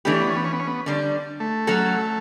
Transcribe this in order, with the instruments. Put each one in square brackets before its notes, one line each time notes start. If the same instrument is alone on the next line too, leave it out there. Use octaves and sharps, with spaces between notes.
[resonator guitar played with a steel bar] E3 A3 D4 G4 [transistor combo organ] B3
[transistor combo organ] C#4
B3
C#4
B3
C#4
B3
C#4
B3
[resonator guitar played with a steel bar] D3 G3 D4
[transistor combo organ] A3
[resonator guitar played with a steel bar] F#3 C#4 F#4 A4